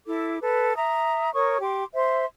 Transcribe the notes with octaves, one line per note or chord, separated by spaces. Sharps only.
E4 A4 D6
A4 B4
E5 A#5 D#6
A#4 C#5 C#6 D#6
G4 C6 D6
C5 E5 C6